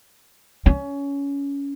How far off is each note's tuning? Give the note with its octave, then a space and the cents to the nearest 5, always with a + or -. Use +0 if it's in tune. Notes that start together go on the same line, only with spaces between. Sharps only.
C#4 +20